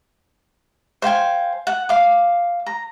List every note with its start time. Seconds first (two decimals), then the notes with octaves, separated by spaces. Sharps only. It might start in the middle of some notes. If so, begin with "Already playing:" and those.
1.02 C5 F5 G5 G#5
1.67 F#5
1.89 F5 D6
2.66 A#5